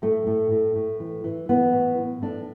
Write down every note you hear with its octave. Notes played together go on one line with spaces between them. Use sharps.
A2 A3
A2
A2
A2
E3
E3
E3 B3
A2
E3
A2 D4